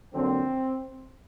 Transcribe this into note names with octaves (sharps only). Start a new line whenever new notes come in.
F2 D3 F#3 A#3 C4